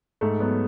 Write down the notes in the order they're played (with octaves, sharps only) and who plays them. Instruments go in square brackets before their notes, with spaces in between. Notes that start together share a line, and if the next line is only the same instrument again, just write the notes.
[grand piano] G#2 A3
F#3 B3